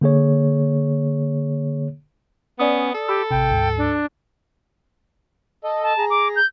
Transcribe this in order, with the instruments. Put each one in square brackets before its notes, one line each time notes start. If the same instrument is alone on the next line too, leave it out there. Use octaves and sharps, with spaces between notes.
[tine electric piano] D3 A#3 G#4 C#5
[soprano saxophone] B3 [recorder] C#4 [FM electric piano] D5 D#6
[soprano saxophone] A4
[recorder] G4 [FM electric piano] B5 E6
[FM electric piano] A1 C3 [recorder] G5
[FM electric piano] D2 G#2
[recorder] D4
[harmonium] A4 D#5
[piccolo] A5
[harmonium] G#4 A#5
[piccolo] D6
G6